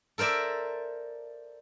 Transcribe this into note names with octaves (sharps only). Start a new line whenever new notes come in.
A4 A#4 C5 D5 E5